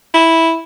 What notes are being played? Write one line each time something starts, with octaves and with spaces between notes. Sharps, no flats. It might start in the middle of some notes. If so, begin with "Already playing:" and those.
E4